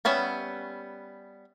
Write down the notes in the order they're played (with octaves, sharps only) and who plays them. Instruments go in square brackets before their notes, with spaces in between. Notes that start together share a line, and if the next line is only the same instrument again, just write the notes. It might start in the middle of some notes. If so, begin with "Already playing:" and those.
[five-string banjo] G3 B3 C#4 E5